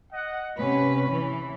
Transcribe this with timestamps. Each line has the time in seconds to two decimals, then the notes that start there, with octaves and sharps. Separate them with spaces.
0.12 D#5 F#5
0.58 C3 C#4 B4 B5
1.11 E3